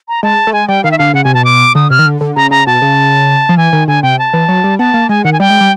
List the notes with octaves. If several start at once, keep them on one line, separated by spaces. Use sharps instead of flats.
A#5
G#3 A5
A3
G#3 G#5
G3 G5
D#3 F5
E5
D3 F5
C#3 F#5
C3 G#5
B2 A5
D6
D3 D#6
C3 F6
D#3
D3
D3
C#3 A#5
C#3 A#5
B2 A5
C#3
F3
E3 G#5
D#3
D3 G#5
C3 G5
A5
E3
F#3
G3
B3 A5
A#3
G#3 G#5
D#3 F#5
G#5
G3 G5
G#3
G3